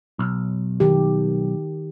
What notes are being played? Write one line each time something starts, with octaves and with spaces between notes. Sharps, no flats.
B1
D#3 G4